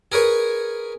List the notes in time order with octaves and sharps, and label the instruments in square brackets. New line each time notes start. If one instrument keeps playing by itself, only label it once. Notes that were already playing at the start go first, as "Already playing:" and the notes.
[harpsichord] G#4 A#4 B4 C#5